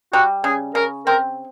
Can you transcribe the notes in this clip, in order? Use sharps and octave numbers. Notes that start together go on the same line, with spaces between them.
G3 F#4
C#3 G#4
C#3 A#4
C4 A#4